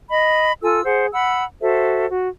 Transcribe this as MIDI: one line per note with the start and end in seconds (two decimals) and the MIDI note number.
0.11 0.53 75
0.11 0.53 83
0.62 0.83 65
0.62 0.83 69
0.62 0.83 80
0.62 0.83 88
0.85 1.07 68
0.85 1.07 72
0.85 1.07 78
1.13 1.44 78
1.13 1.44 83
1.13 1.44 88
1.61 2.05 66
1.61 2.05 69
1.61 2.05 72
1.61 2.05 76
2.08 2.29 66